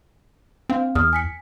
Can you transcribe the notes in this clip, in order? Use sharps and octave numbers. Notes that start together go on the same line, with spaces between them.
C4 D4 F5
E2 D#6 F6
G#5 B6 C#7